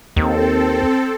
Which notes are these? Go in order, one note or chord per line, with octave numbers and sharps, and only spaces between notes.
D#2 C4 A4